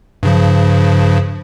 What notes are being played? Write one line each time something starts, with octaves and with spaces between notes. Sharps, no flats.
G2 C#3 F3